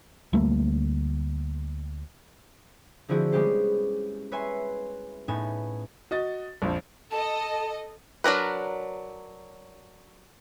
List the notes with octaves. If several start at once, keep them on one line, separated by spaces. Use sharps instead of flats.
D2 G3 A3 A#3
D3 F3 C4 E4 F#4 G#4
G3 G#3 B3 C#4 G4 C5
B4 C#5 E5 G#5 C6
A2 B3 C#4 D#4 G#5 E7
F#4 D#5 A6
A#1 F2 F3
A4 D#5 A5
F#3 D4 A#4 B4